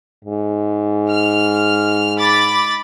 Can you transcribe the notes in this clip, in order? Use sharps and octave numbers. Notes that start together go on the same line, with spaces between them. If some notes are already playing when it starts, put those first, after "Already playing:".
G#2
F6
B5 D6 A6